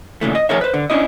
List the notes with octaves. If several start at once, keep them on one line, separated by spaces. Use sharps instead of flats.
A#2 C#3 E3 A3
D#5
F3 G3 G#4 A#4 C#5 E5
B4 C5
D3
C#4 D4 E4 D#5